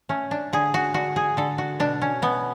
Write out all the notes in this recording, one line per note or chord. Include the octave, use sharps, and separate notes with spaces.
A3 C#4
D4
D3 G#4
F#4
D3 F#4
G#4
D3 A4
F#4
B2 D4
C#4
B2 B3